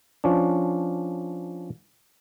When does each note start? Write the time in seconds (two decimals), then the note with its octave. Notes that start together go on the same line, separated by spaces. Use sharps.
0.24 F3 C#4 D4